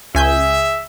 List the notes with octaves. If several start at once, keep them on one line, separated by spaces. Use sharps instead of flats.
C#2 G#4 E5 G#5 G6